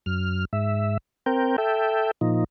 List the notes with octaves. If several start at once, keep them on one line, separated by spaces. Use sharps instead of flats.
F#2 F6
G#2 E5
C4 A#4 G5
A4 E5 G5
A#2 F3 D#4